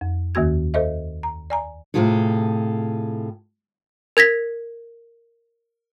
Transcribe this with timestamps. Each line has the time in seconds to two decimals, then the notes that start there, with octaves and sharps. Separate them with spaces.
0.01 F2
0.35 D#2 D#3 A#3 F#4 G#6
0.74 A4 C5 D#5 E5
1.23 A#5
1.50 D5 G#5 A#5
1.94 A2 C3 D#3 F4 G#4 A4
4.17 A#4 G#6 A#6 B6